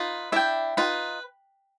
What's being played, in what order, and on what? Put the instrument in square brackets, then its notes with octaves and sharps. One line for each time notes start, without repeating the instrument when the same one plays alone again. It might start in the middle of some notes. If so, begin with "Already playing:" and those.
Already playing: [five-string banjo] D#4 F4 [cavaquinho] B4
[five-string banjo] D4 E4 [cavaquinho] E5 G5
[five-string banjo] D#4 F4 [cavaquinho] B4